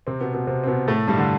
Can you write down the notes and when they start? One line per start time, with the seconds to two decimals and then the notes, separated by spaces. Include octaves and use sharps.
0.07 C3 C4
0.21 B2 B3
0.33 B2 B3
0.47 C3 C4
0.64 C4
0.67 B2 B3
0.87 A2 A3
1.08 G2 G3
1.18 D3